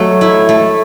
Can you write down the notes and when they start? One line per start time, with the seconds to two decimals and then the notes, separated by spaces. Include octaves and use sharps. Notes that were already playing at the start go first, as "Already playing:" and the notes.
Already playing: F#3 A3
0.21 E4
0.49 A3